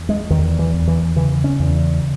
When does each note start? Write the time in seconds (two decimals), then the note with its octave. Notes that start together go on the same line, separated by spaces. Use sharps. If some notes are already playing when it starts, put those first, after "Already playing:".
Already playing: E2
0.09 G#3
0.30 E2 D#3
0.59 E3
0.73 E2
0.88 E3
1.16 C#3 E3
1.44 C#4
1.59 E2